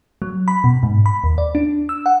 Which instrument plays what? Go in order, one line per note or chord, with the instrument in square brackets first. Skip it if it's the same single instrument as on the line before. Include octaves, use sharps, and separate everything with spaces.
[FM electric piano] F#3
B5
B2
G#2
B5
D#2
D5
D4
E6
F#5